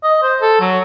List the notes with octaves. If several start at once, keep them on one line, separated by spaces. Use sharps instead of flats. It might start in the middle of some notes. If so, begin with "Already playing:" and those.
D#5
C5
A4
F#3